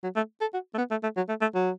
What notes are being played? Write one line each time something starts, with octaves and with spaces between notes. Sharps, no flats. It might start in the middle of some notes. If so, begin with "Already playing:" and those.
F#3
A3
A4
F#4
A3
B3
A3
A3
F#3
A3
A3
F#3